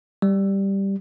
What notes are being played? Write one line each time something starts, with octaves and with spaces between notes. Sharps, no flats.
G3